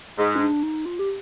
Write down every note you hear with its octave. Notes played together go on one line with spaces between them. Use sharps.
G#2 G#3 G#4
C#4
D4
D#4
F4
G4